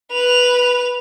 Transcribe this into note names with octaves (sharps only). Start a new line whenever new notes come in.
B4 F7